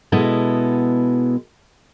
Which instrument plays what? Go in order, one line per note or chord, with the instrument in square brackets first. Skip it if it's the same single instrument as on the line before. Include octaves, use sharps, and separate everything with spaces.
[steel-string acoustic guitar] B2 G#3 B3 E4 A4